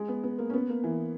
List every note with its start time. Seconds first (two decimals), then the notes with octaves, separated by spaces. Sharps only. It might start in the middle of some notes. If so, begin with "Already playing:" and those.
Already playing: G#3
0.08 B3
0.24 B3
0.38 A#3
0.50 C#4
0.53 B3
0.69 A#3
0.84 E3